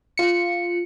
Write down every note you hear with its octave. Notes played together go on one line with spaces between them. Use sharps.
F4 C#7